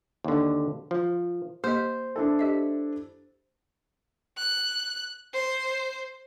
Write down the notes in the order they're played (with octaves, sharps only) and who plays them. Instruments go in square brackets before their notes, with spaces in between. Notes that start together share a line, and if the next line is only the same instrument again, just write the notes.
[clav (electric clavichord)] D#2 D3
F3
[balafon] A#3 G4 D#5 [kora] C5
[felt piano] D4 E4 A4
[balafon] G4 D#5 E5
[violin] F#6
C5